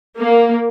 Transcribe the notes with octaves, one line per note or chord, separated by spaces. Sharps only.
A#3